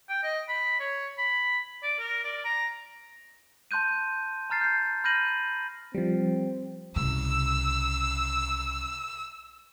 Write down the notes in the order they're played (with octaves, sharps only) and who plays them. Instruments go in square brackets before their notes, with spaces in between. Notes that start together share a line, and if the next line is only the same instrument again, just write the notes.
[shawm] G5
D#5
B5
C#5
B5
D5
A#4
D5
A#5
[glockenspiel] A5 C6 F#6 G6 D#7
A5 A#5 F6 A6 C7
G6 C7
B5 F6 G6 A#6 D#7 F#7
[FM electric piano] F3 G3 [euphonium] C4
[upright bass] C2 C#3 [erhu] E6